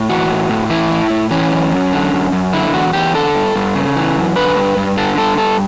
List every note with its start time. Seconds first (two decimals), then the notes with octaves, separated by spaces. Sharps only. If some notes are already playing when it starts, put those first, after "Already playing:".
Already playing: A2
0.09 E3 F#4
0.29 A2
0.49 A2
0.69 E3 E4
0.91 A2
1.10 A2
1.31 E3 C#4
1.51 F#2
1.72 F#2
1.93 D3
2.13 F#2
2.32 F#2
2.53 D3 E4
2.74 E2 F#4
2.93 E2 G4
3.14 D3 A4
3.35 G2
3.55 G2
3.75 C#3
3.96 E3
4.17 F#2
4.36 D3 B4
4.56 G2
4.77 G2
4.97 D3 A4
5.18 G2 A4
5.38 G2 A4